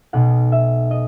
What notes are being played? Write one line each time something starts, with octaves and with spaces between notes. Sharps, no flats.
B1 B2 F#5
E5
D#5